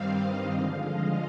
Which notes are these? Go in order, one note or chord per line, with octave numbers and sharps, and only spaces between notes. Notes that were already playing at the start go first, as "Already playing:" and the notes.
Already playing: G2 D#3 G3 C4 F5
D#5
D3 F3 G#3 F5
D#5